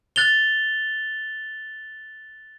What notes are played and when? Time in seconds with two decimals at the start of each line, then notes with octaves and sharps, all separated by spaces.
0.16 F#6 A6 F7 G7